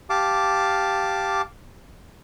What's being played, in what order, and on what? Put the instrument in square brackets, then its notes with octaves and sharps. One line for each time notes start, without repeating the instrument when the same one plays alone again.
[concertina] G4 F5 A5 D6